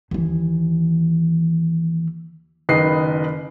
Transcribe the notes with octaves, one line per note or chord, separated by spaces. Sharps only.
D#2 E3
F#1 D#3 B4 D#5 C7